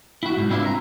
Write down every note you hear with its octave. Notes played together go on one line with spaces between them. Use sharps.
E4 F#4
C2 G#2
C4 D4 E4 F4 B4
A#5